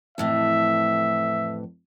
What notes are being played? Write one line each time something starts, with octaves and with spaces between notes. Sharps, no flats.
F2 A2 E3 E5